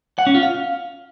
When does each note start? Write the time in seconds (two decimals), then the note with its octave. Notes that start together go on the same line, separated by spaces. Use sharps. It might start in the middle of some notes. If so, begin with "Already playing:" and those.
0.19 F#5
0.27 C#4
0.35 F4
0.43 F5